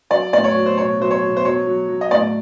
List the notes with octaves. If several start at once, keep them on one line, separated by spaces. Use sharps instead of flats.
F#3 D5
A2 D5
C#5
F#3
C5
B2 C#5
F#3 C5
C#5
B2
C5
F#3 C#5
F#3
F#3
D#5
A2 D5